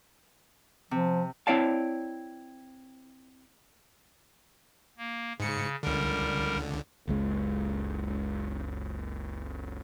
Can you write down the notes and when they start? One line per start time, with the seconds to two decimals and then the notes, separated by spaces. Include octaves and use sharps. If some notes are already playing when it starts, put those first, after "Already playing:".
0.91 C3 F3
1.47 C4 E4 C#5 D5 F5 A5
4.98 A#3
5.40 G#2 C#3 C#7
5.83 C#2 D3 G3 A#4
7.08 F#1 C#2 G#3